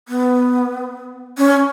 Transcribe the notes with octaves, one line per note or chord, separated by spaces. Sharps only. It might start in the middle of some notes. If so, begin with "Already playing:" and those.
B3
C#4